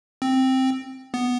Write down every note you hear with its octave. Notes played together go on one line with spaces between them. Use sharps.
C4
B3